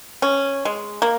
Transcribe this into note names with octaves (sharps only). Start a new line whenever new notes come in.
C#4
G#3
A#3